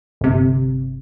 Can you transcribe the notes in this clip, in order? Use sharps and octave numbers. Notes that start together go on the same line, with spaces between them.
G1 C3